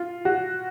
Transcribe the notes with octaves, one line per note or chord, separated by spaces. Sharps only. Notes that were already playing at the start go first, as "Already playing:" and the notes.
Already playing: F4
F#4